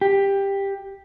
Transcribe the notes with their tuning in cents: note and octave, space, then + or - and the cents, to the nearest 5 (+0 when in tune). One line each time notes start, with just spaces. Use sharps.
G4 +10